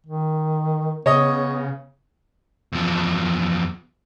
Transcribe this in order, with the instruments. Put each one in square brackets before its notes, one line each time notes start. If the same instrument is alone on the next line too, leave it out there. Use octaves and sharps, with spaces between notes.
[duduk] D#3
[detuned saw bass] C#3 [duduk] B3 [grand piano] C#5 D#5 D#6
[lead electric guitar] E2 F3